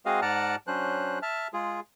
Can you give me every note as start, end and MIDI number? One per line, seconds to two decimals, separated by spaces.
0.06 0.20 56
0.06 0.20 60
0.06 0.20 66
0.06 0.20 68
0.06 0.20 75
0.06 0.20 77
0.22 0.56 44
0.22 0.56 74
0.22 0.56 78
0.22 0.56 81
0.22 0.56 82
0.22 0.56 89
0.67 1.19 54
0.67 1.19 61
0.67 1.19 62
0.67 1.19 72
0.67 1.19 90
1.22 1.48 76
1.22 1.48 81
1.22 1.48 89
1.53 1.80 56
1.53 1.80 65
1.53 1.80 68